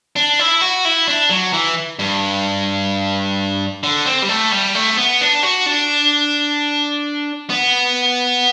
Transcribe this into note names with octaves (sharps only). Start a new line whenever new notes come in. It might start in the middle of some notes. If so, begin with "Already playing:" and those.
D4
E4
F#4
E4
D4
F#3
E3
G2
D3
C4
G3
A3
G3
A3
B3
D4
F#4
D4
B3